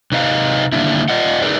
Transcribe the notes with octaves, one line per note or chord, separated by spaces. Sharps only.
C3 D#4 B4 D#5 F5
D3 D#3 G3 A#3 D4 E4
F4 D5 D#5 F#5
D#4 G#4 A#4 B4 D5